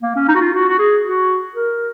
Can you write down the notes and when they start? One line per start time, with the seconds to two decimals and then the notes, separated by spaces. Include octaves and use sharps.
0.03 A#3
0.16 C#4
0.29 D#4
0.35 F#4
0.41 F4
0.54 F#4
0.68 F#4
0.79 G#4
1.04 F#4
1.55 A#4